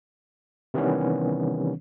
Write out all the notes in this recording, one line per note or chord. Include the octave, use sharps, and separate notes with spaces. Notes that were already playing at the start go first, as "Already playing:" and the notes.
C3 D#3 E3 G3 B3 C#4